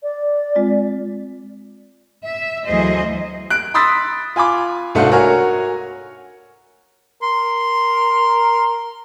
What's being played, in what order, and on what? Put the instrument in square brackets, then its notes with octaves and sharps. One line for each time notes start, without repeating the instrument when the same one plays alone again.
[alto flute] D5
[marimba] G#3 C4 F4
[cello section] E5
D2 E3 F#3 G#4 C5 D#5
[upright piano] F#6 D7
B5 C6 D#6 E6 A6 B6
F4 G#5 B5 D6
C2 G#2 A3 D4 F#4 F5
F#4 A#4 C#5 G#5 F6
[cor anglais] A#4 [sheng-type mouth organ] C6